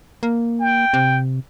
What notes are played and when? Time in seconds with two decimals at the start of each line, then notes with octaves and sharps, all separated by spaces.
0.23 A#3
0.60 G5
0.94 C3